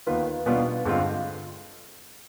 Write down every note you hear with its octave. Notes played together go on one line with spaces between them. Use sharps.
D#2 D#3 B3 F4 B4
B2 G3 B3 D4 F4
G2 D3 G#3 C4 F4